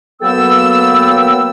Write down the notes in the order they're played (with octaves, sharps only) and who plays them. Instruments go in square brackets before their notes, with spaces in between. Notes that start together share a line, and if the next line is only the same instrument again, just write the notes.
[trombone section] F#3 A#3 B3 [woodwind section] A4 G5 E6